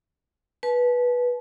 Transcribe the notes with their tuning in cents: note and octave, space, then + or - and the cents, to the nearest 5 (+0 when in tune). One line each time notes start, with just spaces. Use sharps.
B4 -15 A5 -35